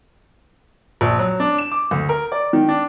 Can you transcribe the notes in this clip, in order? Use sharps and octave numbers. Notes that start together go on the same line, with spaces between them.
A#1
F#3
D4
E7
D6
D2
A#4
D5
D#3
D4